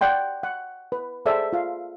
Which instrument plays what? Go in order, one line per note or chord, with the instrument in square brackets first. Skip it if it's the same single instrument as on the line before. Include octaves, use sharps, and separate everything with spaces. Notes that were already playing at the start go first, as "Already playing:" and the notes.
[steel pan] D5 F#5 G5 C6
F#5
B4
G#4 A4 C5 D5 E5
F4 F5